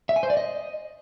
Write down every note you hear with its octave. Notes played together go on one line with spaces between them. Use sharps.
E5
G#5
C5
D5
D#5